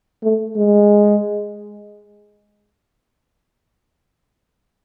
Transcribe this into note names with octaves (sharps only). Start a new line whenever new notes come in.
A3
G#3